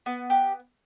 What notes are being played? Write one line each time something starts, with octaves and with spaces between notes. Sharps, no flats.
B3
G4